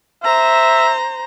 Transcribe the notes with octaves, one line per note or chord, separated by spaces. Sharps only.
C5 E5 A#5